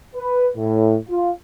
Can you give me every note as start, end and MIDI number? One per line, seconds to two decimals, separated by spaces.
0.13 0.47 71
0.55 0.96 45
1.09 1.30 65